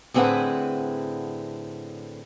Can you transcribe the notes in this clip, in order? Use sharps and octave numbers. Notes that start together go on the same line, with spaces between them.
A2 D3 C4 G#4 B4 F#5